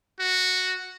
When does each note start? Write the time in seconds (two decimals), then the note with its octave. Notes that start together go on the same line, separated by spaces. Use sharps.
0.20 F#4